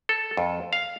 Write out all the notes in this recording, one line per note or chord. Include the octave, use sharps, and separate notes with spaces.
A4
F2
F5